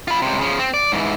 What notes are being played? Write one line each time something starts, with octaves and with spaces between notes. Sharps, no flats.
F4 B5
C#2 C3
C#3 F3
C4
D5
G#2 E3